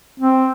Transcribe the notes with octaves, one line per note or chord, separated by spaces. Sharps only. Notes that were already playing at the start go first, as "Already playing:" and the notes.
C4